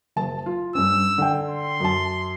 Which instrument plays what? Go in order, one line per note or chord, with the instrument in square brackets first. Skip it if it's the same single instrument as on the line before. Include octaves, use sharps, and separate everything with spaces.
[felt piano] F#1 A5
F4
[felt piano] G2 C#4 [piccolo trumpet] E6
[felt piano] D3 G5
[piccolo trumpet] C6
[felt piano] F#2 A5